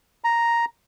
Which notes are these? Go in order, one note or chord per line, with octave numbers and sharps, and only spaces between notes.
A#5